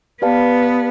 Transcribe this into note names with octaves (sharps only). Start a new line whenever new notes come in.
B3 G4 B4 D5 F5 A5